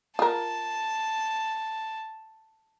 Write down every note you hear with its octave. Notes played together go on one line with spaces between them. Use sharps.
F4 A#4 A5